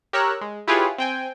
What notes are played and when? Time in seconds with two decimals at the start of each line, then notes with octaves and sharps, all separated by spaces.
0.13 G4 A#4 C#5 A#5 E6 F#6
0.41 G#3
0.67 E4 F4 G4 G#4 B4 C#5
0.98 C4 G5 G#5